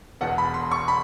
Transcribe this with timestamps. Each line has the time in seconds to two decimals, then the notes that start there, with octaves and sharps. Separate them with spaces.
0.21 E1 E2 B2 F#5
0.38 B5
0.54 C6
0.71 C#6
0.88 B5